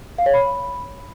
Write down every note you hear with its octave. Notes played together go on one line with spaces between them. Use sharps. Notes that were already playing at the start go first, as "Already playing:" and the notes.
F5
C#5
B5